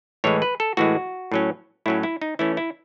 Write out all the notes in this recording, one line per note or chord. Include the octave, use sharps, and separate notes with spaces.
A2 E3 G#3 C#5
B4
A4
A2 E3 G#3 F#4
A2 F#3 C#4
A2 F#3 C#4 E4
E4
D#4
E3 A3 C#4 E4
E4